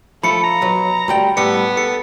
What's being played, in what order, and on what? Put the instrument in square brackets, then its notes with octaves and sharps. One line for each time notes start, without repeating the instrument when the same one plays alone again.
[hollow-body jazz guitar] F3 [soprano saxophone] A3 [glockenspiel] B5 C#7
[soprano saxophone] A#5
[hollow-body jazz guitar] B1 F#3 B4
D2 G3 G5
[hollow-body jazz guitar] A2 G3 [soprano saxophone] B3 [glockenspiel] C#7
[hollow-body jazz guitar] A4 [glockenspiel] C#7